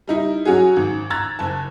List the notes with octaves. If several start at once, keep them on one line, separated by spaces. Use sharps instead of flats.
G3 D#4 E4
F#3 C#4 F#4 G#4
G#1
A#5 E6 F#6 G#6 A6
F#1 A5